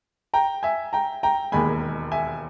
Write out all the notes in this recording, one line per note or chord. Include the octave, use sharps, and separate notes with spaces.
G5 A#5
E5 G#5
G5 A#5
G5 A#5
E1 D#2 D#3 G#3 G#5 B5
E5 G#5